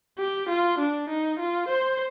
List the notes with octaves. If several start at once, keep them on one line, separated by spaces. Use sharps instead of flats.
G4
F4
D4
D#4
F4
C5